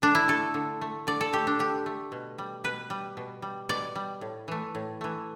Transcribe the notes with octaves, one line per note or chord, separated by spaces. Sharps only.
D3 D4
E4
A3 A4
D3
A3
D3 D5
A4
A3 G4
D4
D3 G4
A3
B2
G3
B2 B4
G3
B2
G3
B2 D5
G3
A2
E3 A3
A2
E3 A3